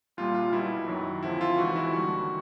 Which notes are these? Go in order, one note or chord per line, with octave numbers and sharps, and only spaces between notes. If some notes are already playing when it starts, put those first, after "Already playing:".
C2 A#2 G3 F4
F4
B1 B2 G3 E4
F#2 D#3 F#3
D2 C3 F3 E4
F4
G#1 G#2 E3 F#4
E4
D#2 D3 G3 F#4